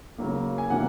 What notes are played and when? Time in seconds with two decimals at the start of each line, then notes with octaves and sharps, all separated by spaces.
0.18 C#3 F#3 A#3
0.58 G#5
0.70 C3 D#3 F#3 A#3 F#5